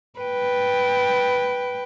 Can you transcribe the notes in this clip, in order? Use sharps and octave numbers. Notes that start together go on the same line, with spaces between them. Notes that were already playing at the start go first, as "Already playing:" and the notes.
B4 G5